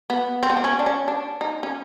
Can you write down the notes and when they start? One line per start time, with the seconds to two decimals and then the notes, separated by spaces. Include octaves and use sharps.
0.10 B3
0.43 C4
0.50 B3
0.57 C4
0.64 C#4
0.79 D4
0.86 C#4
1.08 D4
1.41 D#4
1.63 C#4